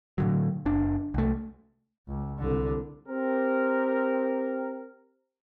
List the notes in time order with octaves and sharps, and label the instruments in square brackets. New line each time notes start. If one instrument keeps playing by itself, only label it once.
[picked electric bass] A2 D3 F#3
F#1 D4
C2 A3
[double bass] C#2
C2 D3
[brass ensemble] C4 G4 A#4